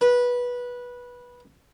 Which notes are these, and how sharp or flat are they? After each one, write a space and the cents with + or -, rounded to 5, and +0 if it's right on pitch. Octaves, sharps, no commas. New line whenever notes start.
B4 -15